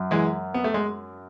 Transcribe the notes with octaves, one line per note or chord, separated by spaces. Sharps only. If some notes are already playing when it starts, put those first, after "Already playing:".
Already playing: F#2
E3 G#3
B3
A3
G#3